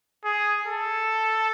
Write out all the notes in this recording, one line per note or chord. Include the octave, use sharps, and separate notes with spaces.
G#4
A4